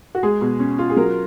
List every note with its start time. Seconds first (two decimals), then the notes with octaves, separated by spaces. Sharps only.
0.15 F#4
0.23 G#3 G#4
0.41 B2
0.59 C#4
0.78 F4
0.90 G#4
0.96 F#3 A#4